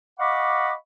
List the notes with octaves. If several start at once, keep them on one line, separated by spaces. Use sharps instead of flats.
D#5 F5 F#5 B5 C#6 D6